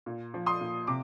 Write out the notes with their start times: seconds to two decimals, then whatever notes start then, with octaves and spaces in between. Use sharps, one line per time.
0.06 A#2
0.34 F3
0.46 C6 D#6
0.61 A#2
0.87 C3 D6